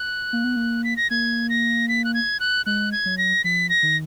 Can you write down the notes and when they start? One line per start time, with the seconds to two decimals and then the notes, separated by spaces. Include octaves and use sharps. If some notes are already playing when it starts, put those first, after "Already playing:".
Already playing: F#6
0.33 A#3
0.44 B3
0.56 A#3
0.84 B6
0.97 A#6
1.10 A#3 G#6
1.49 A#6
1.88 B6
2.04 F#6
2.14 G#6
2.40 F#6
2.66 G#3 F#6
2.92 G#6
3.06 F#3
3.18 A#6
3.44 F3 B6
3.69 A#6
3.83 D#3